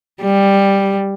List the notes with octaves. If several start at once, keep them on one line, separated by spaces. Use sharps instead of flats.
G3